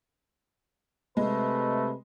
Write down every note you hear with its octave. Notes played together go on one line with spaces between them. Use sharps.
C3 G#3 A3 B4